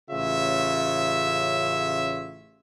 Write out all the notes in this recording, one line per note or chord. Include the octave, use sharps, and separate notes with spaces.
A1 C#3 F4 C#5 E5